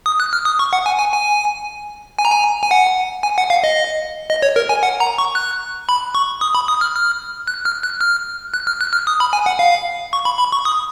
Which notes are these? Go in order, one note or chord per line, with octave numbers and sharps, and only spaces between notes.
D#6
F#6
F6
D#6
C#6
F#5
G#5
G#5
G#5
G#5
A#5
G#5
G#5
F#5
G#5
F#5
F5
D#5
D#5
C#5
A#4
G#5
F#5
A#5
C#6
F#6
B5
C#6
D#6
B5
D#6
F6
F6
F#6
F6
F#6
F6
F#6
F6
F#6
F6
D#6
B5
G#5
F#5
F5
C#6
B5
B5
C#6
D#6